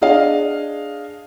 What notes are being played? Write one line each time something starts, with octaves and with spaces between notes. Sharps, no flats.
D4 G#4 D#5 F5